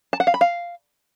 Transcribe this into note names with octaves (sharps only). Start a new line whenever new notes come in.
A5
F#5
F5
B5
F5